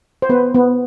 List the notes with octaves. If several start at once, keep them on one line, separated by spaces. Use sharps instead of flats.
C5
B3 B4
B3